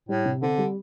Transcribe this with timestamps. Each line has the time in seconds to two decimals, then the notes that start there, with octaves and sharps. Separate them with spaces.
0.09 A2 G3
0.25 C3
0.42 D3 C4
0.58 G3